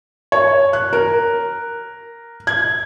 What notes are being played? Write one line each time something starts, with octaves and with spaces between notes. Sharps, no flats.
C#5
F#6
A#4
G#6